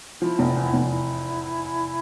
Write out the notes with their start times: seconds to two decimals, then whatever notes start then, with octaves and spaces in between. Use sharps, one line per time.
0.21 F3 E4
0.39 F1
0.56 E2
0.74 F1
0.90 E4